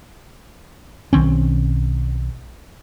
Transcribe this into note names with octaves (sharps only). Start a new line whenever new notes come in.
B1 D#3 C4 C#4